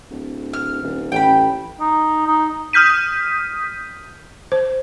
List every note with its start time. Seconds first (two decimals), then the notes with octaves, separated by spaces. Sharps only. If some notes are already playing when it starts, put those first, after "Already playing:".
0.10 D1
0.53 F6
0.82 D#1
1.12 A1 G5 B5
1.80 D#4
2.27 D#4
2.73 D#6 F6 G6 B6 D#7
4.52 C5